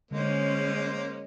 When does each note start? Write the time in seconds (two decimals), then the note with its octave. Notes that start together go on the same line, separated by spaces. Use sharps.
0.11 D3 G#3 A#3 C#4 C5